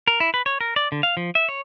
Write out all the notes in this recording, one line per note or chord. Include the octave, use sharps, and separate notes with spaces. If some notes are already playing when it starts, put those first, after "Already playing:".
A#4
E4
B4
C#5
A#4
D5
D3
F5
F3
E5
C#5